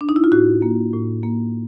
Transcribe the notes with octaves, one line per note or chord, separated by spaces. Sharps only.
D4
D#4
E4
F4
A2 F#4
A#3
A2
A#3